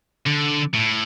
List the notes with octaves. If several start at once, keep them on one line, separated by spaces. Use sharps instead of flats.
D3
A2